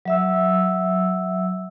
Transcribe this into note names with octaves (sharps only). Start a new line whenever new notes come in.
F#3 E5 E6